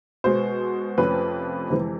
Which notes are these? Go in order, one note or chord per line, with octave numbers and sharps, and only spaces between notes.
B2 G#3 B3 C5
F2 C3 F3 A3 C#4 B4
F2 C3 E3 G#3 C4